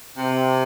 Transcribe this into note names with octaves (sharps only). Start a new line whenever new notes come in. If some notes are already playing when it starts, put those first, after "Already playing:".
C3